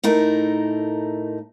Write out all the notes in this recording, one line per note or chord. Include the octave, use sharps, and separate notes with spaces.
A2 A3 D#4 A#4